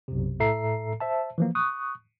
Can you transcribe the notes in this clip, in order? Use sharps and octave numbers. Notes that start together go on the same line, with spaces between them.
B1 F#2 C3
A2 A4 E5 A#5 C7
C5 E5 A5
E3 F3 A#3
C#6 D#6 F#6